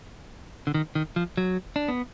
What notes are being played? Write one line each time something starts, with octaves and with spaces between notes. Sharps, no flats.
D3
D#3
D#3
F3
F#3
D4
B3